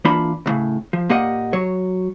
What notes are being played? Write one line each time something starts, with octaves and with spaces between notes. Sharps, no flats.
E3 A#3 D4 F4 A5 B5
D2 A2 C#3
F3
A#2 A#3 G4 D#5 F#5
F#3 C#5